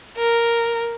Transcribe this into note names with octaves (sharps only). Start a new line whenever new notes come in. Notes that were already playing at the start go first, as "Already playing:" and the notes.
A#4